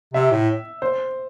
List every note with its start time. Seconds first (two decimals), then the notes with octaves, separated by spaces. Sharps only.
0.14 C3 E5
0.31 A2
0.82 C5